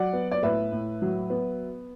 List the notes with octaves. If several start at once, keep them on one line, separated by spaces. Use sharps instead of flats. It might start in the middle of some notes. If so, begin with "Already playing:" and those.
Already playing: F#3 D5 F#5
B3
D5
A2 B4 E5
A2
F#3
B3